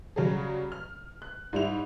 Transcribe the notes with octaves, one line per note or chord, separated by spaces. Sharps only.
C#3 F#3 G3 G#4
F6
F#6
G#2 G3 E4 F7